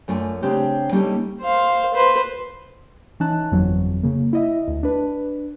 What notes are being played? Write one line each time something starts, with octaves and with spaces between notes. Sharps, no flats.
F#2 A3 F4 D5 G#5
C#3 C4 D4 G4
G3 A#3 C#4 D#4 G4 A4
C5 F5
B4 C5
E3 C#4 D#4 A5 F#6
G1 F2 E3 F#3
C#3 A#3
E4 D#5 E5
D2
D4 B4